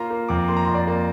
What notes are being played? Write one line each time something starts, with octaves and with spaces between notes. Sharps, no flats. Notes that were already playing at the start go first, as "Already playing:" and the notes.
Already playing: A#3 F4 A#5 C6
A#3
F2 D6
A#3 C6
A#5
C6
F2
D5
A#3